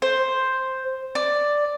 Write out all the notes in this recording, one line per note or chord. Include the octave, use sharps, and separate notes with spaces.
C5
D5